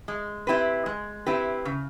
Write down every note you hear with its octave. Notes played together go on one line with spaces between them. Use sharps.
G#3
C4 E4 G4 B4
G#3
C4 E4 G4 B4
C#3